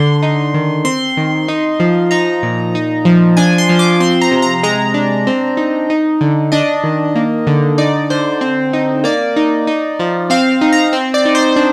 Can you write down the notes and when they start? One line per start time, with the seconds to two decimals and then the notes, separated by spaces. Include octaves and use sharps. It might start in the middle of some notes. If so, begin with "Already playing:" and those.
Already playing: D3 C6
0.23 D#4
0.54 D#3
0.85 C4 C6
1.17 D#3
1.48 D#4
1.80 F3
2.11 D#4 A#5
2.43 A#2
2.75 D#4
3.05 F3
3.37 D4 G#5
3.58 C6
3.69 F3
3.79 D6
4.00 C4 C6
4.21 A#5
4.31 C3
4.42 A#5
4.63 G#3 A#5
4.94 D4
5.27 C4
5.57 D#4
5.90 D#4
6.21 D3
6.52 D4 D#5
6.84 D#3
7.15 A#3
7.47 D3
7.78 D#4 D5
8.10 D3 C5
8.41 C4
8.73 D#4
9.04 A#3 D5
9.36 D#4
9.67 D#4
9.99 F3
10.30 C4 F5
10.61 D#4
10.73 A#5
10.93 C4
11.14 D5
11.25 D#4
11.35 C5
11.56 D4